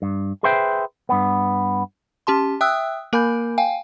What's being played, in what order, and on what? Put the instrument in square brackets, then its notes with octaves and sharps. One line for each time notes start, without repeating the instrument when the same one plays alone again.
[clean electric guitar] G2
G#4 B4 C5 E5 G5
G2 B3
[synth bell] C#4 G4 A5 C6
E5 G5 D#6 E6 F#6
A#3 A#4 G#5 B5 G6
F5 G5 G#5